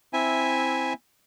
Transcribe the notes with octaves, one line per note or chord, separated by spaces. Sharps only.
C4 E4 E5 G#5